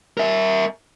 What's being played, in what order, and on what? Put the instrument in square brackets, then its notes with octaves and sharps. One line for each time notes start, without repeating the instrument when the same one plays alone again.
[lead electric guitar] A#4 E5